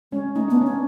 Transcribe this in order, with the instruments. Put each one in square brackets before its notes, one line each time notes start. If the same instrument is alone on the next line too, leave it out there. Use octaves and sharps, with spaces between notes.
[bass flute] G#3 [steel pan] C#4
[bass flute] A3 [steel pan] D#4
[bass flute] B3 [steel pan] D4
[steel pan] C#4
[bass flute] C4